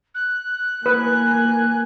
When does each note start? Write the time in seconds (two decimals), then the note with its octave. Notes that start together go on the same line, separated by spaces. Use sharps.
0.15 F#6
0.86 A#3 B4 G#5